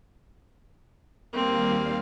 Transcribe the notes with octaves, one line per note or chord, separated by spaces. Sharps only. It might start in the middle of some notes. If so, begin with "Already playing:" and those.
D#2 G3 A#3 C4 F5